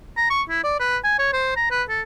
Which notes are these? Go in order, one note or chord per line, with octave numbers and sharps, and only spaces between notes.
A#5
C#6
E4
D5
B4
G#5
C#5
C5
A#5
B4
A4